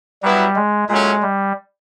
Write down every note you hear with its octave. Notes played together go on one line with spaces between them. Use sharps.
F#3 G3 B3 E4
G#3
A#2 F#3 G#3 A3 C#4
G3